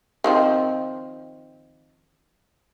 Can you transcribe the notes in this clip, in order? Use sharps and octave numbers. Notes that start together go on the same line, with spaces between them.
D#3 F3 C4